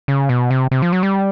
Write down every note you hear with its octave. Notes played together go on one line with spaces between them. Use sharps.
C#3
B2
C3
C3
F3
F#3
G3